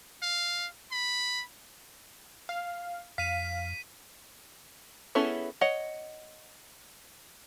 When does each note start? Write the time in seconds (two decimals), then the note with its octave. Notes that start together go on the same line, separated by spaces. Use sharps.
0.22 F5
0.92 B5
2.49 F5
3.18 F2 F5 B6 D#7
5.15 B3 C#4 E4 G#4 A4
5.61 C#5 D#5 F#5